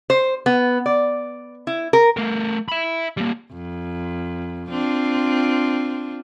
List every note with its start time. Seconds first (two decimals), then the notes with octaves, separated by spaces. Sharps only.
0.10 C5
0.46 B3
0.86 D5
1.67 E4
1.93 A#4
2.17 A3 A#4
2.69 E5 B5
3.17 G3 A#3
3.52 F2
4.70 C4 D4 F4